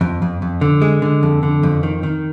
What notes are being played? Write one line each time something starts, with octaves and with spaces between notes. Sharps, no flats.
F2
F2
F2
D3
G#3
D3
F2
D3
F2
D#3
D#3